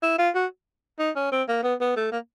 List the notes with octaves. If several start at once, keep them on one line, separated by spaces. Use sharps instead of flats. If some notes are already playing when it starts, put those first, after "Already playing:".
E4
F4
F#4
D#4
C#4
C4
A#3
B3
B3
A3
A#3